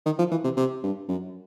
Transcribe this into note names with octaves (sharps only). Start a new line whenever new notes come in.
D#3
F3
E3
C3
C3
G2
F#2